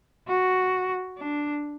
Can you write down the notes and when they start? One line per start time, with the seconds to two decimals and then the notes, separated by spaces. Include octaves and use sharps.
0.28 F#4
1.18 D4